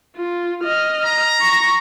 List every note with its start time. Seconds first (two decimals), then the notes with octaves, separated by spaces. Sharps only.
0.16 F4
0.64 D#5 F6
1.05 A#5
1.41 C#6 A#6